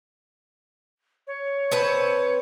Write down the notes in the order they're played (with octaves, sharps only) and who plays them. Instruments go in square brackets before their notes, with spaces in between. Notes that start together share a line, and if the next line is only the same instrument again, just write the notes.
[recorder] C#5
[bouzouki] C4 B4 A5